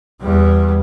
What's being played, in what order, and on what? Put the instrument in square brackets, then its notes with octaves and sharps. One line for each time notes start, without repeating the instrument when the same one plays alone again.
[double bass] E2 G3